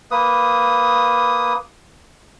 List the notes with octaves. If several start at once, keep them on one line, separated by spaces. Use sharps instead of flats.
A#3 B4 D#6